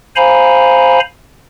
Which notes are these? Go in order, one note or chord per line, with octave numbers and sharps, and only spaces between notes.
C5 F5 G#5 A#5 B5